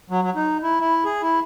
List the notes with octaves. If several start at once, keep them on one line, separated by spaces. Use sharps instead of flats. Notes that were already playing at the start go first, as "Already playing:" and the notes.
F#3
F#3
D#4
E4
E4
G#4
E4